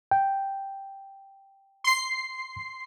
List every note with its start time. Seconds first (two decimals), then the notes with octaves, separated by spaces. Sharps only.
0.11 G5
1.84 C6 C7